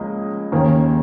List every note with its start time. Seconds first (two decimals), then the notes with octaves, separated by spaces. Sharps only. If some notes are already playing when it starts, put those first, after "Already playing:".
Already playing: C#2 F3 A#3 C#4 D#5
0.52 D#2 D#3 A#3 C#4